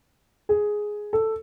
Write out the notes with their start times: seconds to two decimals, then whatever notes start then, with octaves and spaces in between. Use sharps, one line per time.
0.49 G#4
1.13 A4